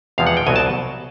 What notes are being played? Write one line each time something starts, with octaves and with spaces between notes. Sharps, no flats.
E2 C3 F3 G#3 F5
F#5
G5
C2 B2 F#3 G#5
A5